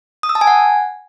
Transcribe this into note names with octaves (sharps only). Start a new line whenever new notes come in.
D#6
E6
A5
G#5
F#5